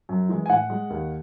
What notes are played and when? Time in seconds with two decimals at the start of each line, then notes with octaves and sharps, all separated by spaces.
0.09 F#2
0.29 E3 G#3
0.46 G#5
0.49 A2 F#5
0.70 G#3
0.90 D#2